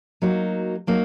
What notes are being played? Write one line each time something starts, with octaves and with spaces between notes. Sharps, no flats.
F#3 A#3 D#4 F#4
F#3 A#3 D#4 F#4